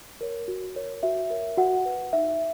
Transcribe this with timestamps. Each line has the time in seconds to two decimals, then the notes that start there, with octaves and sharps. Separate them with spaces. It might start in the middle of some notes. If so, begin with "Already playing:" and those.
0.21 A#4 C#5
0.48 F#4
0.76 A#4 C#5
1.03 F#4 E5
1.30 A#4 C#5
1.58 F#4 F#5
1.85 B4
2.13 D#4 E5